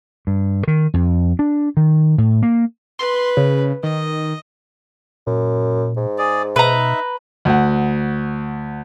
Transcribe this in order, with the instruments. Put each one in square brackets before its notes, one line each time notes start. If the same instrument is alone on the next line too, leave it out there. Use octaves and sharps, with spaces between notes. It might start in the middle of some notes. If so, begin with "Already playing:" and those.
[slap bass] G2
D#3
F2
D4
D#3
A2
A#3
[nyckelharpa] B4 [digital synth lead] C6
[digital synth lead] C#3
[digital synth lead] D#3 [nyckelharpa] D#5
[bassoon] F#2 [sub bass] A#2
[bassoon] G#2
[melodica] G#4 D5
[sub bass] B2 [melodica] D#4 E5 [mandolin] B4 A#5
[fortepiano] D2 F#5